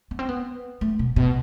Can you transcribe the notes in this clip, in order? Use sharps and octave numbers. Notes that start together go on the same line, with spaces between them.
B3
C4
B3
A3
B2
B2